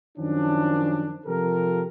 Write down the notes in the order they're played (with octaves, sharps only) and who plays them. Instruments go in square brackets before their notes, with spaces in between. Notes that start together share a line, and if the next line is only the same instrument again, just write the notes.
[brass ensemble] F#2 D#3 F3 C#4 D4
C3 F3 F4 G4 A4 A#4